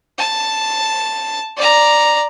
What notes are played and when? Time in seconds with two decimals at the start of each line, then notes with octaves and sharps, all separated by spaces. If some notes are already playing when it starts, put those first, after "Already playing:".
0.18 A5
1.57 D5 A#5